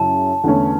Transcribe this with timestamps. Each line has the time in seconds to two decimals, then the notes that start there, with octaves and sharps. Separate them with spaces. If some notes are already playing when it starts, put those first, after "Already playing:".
Already playing: F#2 C#3 C#4 E4 A5
0.44 E2 D3 A3 C#4